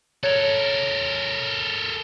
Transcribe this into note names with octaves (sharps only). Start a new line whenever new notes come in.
A4 A#4 C#5 G#6